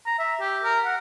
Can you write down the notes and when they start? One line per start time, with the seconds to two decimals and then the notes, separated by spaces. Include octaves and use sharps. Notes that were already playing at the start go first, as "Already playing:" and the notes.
0.06 A#5
0.19 E5
0.40 G4
0.63 A#4
0.85 F#5